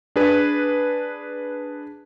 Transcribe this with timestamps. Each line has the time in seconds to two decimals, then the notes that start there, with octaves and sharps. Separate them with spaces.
0.16 D4 G#4 B4